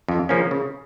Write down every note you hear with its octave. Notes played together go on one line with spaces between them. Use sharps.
F2
C#3 F3 A#3 C#4
C#3